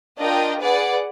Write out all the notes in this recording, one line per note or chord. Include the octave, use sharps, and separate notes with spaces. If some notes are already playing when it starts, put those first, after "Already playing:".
D4 F4 A#4 D#5 G5
G#4 B4 D5 F#5